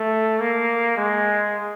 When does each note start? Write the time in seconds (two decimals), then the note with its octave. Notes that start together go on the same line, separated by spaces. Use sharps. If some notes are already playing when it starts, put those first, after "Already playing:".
Already playing: A3
0.40 A#3
0.97 G#3